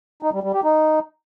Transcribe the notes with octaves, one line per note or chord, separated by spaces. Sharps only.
D#4
G3
G3
G4
D#4